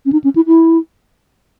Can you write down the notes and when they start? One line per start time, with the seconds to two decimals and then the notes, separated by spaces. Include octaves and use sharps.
0.06 C#4
0.13 D#4
0.24 C#4
0.36 E4
0.47 E4